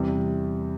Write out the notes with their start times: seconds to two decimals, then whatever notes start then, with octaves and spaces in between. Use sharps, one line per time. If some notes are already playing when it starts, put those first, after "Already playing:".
Already playing: E2 C3 G3